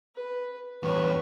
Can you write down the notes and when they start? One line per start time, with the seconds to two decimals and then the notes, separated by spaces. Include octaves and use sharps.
0.15 B4
0.83 E2 G2 B4 C#5 C#6